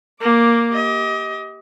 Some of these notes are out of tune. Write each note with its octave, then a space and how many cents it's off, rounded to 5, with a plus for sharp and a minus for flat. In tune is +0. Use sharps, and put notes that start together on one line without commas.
A#3 +0 D6 +0
G4 +0 D#5 +30